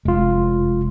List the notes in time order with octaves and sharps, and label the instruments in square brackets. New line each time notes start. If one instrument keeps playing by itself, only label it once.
[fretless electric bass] F1 [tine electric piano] G#3 F4